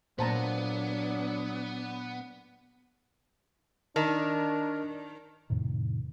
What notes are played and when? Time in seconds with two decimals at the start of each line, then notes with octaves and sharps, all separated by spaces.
0.19 A#2 F#3 A#3 B3 D4 C5 A5 A#5
3.96 D#3 D4 A#4 D#5 A5
5.50 F2 A2 C3 D#3